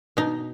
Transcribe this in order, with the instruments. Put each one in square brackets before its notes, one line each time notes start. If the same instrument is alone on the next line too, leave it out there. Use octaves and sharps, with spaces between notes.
[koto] B2 D#4